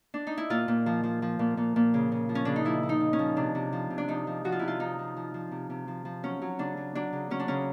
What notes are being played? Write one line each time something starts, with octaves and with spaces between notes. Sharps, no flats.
D4
D#4
E4
A#2 F4
A#2
F3
F3
F3
A#2
A#2
A#2
C#3
C#3
F3
C#4
C#3 D4
D#4
F3 E4
F3
D#4
C#3
C#4
F3
C3 D4
C3
F3
C3
D4
F3 D#4
F3
F3 F#4
F4
C3 E4
F4
F3 D#4
F3
F3
F3
C3
C3
F3
F3
F#3 C#4
F#3
C#3 D4
F#3
F#3 D4
C#3
F#3 C#4
D4
C#3 C#4